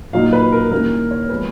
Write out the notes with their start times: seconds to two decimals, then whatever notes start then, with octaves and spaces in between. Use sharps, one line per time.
0.13 A#2 F#3 A#3 D#4 F5
0.33 B4
0.52 A#4
0.72 D#3 G3 A#3 C#4 E4 A#4
1.11 C#5
1.29 F3 G#3 B3 B4